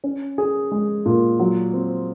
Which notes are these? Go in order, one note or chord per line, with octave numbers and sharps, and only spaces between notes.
C#4
G#4
G#3
A#2
F#3
C4